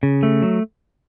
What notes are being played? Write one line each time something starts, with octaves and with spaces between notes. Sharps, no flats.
C#3
A3
F#3